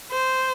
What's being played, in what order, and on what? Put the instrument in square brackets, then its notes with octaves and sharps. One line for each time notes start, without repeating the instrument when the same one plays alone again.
[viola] C5